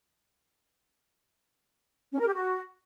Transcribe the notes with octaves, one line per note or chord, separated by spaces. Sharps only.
C#4
A#4
G4
F#4